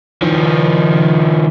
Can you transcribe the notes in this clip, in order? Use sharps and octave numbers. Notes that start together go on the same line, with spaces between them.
D#3 F3